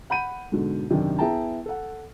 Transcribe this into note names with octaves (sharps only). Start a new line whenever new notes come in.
F#5 B5 G6 D#7
G#2 B2 D3
F#2 C3 D#3 D4
B3 E4 G#4 G5 A5 A#5
A4 F#5